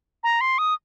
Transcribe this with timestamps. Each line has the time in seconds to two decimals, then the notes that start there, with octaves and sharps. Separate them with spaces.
0.24 A#5
0.41 C6
0.58 D#6